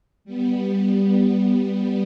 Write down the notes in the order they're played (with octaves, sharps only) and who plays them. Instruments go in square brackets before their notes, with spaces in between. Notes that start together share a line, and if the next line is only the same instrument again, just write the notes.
[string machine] G3 B3